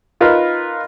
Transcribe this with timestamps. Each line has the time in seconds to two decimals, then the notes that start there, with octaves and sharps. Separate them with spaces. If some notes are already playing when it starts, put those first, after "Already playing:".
0.20 D#4 F4 A#4 B4